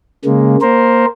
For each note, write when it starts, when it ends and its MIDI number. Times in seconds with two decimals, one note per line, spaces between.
0.25 0.57 49
0.25 0.57 56
0.25 0.57 58
0.62 1.06 58
0.62 1.06 70
0.62 1.06 72